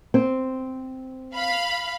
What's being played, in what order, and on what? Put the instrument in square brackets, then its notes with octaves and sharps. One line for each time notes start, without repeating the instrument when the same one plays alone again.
[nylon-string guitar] C4
[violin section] F5 B5